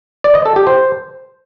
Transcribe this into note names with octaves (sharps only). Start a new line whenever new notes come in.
D5
D#5
A4
G4
C5